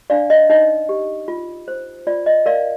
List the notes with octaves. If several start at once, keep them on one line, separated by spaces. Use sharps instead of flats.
D4 D5 F5
D#5
D#4 D#5
G4
F4
C5
F4 D5
D#5
A#4 D5 F5